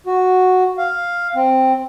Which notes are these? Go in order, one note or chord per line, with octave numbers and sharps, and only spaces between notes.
F#4
F5
C4